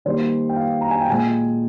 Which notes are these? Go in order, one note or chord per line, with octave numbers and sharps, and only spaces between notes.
D#3 G3 A#3 C5
G5
F5
A#5
G#5
G5
A#2 G#3 G#5